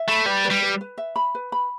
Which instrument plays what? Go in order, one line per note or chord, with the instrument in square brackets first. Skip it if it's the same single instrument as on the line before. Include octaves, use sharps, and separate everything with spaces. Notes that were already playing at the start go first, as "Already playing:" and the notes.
Already playing: [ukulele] E5
[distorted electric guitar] A3 [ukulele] B5
[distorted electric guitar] G3 [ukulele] B4
[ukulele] B4
[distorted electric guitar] G3
[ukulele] B4
B4
E5
B5
B4
B5